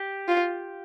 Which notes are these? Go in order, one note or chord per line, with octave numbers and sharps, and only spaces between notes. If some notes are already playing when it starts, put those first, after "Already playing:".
Already playing: G4
F4